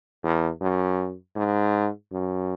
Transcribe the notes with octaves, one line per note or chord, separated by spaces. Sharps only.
E2
F#2
G#2
F#2